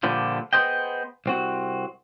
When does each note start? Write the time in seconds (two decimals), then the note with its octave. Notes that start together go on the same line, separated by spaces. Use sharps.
0.03 A#2 D3 F3 G3
0.53 B3 G#4 A4 C5 D#5 G5
1.26 C2 C4 F#4